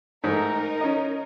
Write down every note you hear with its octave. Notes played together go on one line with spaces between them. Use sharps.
G#2 A3 D#4 A#4
C#4 D#5